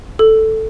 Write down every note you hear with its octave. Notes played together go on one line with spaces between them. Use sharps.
A4